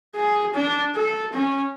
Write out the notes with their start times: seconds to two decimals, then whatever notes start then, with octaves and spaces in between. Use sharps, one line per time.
0.16 G#4
0.54 D4
0.95 A4
1.33 C#4